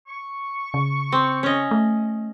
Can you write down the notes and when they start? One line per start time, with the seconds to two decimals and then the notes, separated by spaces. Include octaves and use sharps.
0.08 C#6
0.74 C#3
1.12 C4
1.43 C#4 D#5
1.71 A3